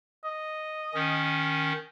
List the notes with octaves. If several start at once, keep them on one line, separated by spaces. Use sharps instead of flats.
D#5
D#3 C#4